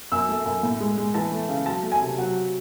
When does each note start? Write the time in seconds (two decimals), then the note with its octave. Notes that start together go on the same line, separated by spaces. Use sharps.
0.12 F#2 E6
0.29 A3
0.46 F#2
0.63 A2
0.80 G#3
0.97 G#3
1.14 E3 A5
1.32 A3
1.49 C#3
1.66 F#3 A5
1.83 A3
1.92 G#5
2.01 C3
2.18 F#3 F#5